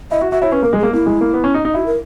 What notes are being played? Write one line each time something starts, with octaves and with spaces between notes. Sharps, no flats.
E4 D#5
F#4 E5
F#4 E5
E4 C#5
C#4 B4
A#3
A#4
G#3
A#3 G#4
A#3 E4
G#3
A#3
B3
C#4
D#4
D#4
E4 F#4
A#4